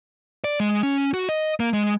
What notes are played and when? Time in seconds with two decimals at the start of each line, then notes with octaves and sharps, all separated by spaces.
0.44 D5
0.60 G#3
0.83 C#4
1.14 F#4
1.29 D#5
1.60 A#3
1.73 G#3